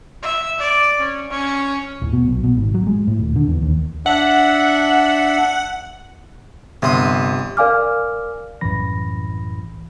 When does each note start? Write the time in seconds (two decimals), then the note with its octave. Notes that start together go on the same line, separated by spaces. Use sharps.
0.23 E5
0.59 D5
0.99 C#4
1.30 C#4
2.02 D1
2.13 B2
2.28 B1
2.44 B2
2.57 G#1
2.74 F#3
2.87 G#3
3.07 A2
3.19 D#1
3.36 D3
3.48 E2
3.62 D#2
4.06 D4 E5 F#5
6.82 G1 C3 C6 D#6
7.57 A#4 D5 F5 G#5 D6 F6
8.61 C2 F#2 A2 E3 B5 A#6